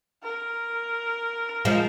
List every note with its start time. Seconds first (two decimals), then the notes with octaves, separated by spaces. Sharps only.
0.23 A#4
1.65 F3 G#3